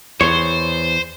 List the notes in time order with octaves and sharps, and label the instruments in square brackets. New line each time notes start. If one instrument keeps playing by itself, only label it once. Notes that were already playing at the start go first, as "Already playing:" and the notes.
[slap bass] E2 [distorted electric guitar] C5 [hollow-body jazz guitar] C#5